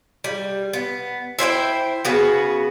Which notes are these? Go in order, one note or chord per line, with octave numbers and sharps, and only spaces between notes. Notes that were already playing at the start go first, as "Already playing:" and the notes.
G3
B3
E4 C5 C#5 G5
C#3 B3 F#4